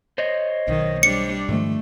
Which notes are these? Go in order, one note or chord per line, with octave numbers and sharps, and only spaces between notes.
C5 C#5 D#5
B1 D#3
G3 D4 C#7
G#2 D#3 F3 A3